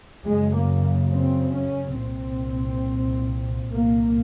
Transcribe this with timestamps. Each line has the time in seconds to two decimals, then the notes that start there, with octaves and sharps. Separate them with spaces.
0.25 F#2 C#3 G#3
0.54 A#3
1.12 C4
1.55 C#4
1.99 C2 A#2 C4
3.73 C2 A#2 A#3